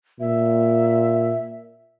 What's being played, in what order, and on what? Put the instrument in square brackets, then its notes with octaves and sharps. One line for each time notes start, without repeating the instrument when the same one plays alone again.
[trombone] A#2 [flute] E5